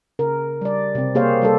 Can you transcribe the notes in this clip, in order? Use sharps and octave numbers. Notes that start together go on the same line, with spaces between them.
C#3 A#4
G3 D5
C3 C4
A#3 G4 G#4 C5 C#5 F5
G3 G4 A4